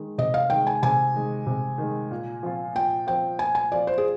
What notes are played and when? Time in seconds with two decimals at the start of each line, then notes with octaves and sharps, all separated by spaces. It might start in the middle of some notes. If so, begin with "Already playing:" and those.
Already playing: D#3 G#3
0.18 C3 D#5
0.34 F5
0.50 D#3 G#3 G5
0.67 G#5
0.82 C3 G#5
1.14 D#3 G#3
1.47 C3
1.78 D#3 G#3
2.11 A#2
2.43 F3 C4 F4
2.75 A#2 G5
3.07 F3 C4 F4 G5
3.39 A#2 G#5
3.55 G#5
3.71 F3 C4 F4 D5
3.87 C5
3.98 G#4